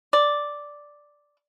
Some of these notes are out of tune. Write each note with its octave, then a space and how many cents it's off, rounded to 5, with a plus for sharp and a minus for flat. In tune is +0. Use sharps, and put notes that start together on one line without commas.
D5 +0